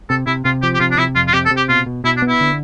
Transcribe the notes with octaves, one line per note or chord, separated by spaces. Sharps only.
C3 A4
C3 E4
C3 F4
F3 G4
G4
C3 F4
D4
C3 E4
F2 F4
F4
C3 G4
A4
C3
G4
B2 F4
B2
B2 E4
D4
B3
E4
D3